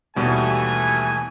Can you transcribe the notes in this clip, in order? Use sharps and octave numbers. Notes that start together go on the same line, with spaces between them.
D#2 B2 E3 G3 A3 G#5